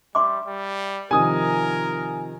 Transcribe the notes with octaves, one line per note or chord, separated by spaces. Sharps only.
G3 E5 C6 D6
G3
C3 D#3 F3 A#4 G#5 D#6